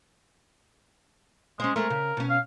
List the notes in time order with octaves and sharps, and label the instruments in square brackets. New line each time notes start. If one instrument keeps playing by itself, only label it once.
[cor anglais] G#3 [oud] C#4 C5
[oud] G#3 A3 [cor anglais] A#4
[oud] C#3
B2 C#4
[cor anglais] F5